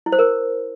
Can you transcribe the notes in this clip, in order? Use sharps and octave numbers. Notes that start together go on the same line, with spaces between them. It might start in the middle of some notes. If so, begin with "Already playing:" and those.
E4
C5
A#4